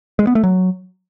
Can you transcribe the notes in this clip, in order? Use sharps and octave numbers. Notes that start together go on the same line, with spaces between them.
G#3
B3
A3
F#3